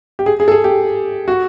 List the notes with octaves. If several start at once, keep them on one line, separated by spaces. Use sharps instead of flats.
G4
G#4
G#4
A4
G#4
G4
F#4